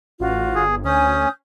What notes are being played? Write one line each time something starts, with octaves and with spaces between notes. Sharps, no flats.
A1 F4 F#4
G1 G#4
D2 C#4 G#5 D#6 G6